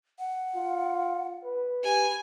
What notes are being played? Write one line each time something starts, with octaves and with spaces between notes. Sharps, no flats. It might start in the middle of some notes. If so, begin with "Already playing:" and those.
F#5
F4
B4
G4 G#5